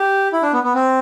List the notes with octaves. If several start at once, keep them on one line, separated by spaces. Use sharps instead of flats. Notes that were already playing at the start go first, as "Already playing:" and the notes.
Already playing: G4
E4
D4
B3
B3
C4